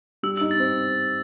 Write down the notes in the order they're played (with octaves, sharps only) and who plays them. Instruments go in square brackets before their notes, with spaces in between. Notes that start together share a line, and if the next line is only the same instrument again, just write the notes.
[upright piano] G3 [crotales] E6
[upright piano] D#4 [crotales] E6
[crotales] A6
[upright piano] C4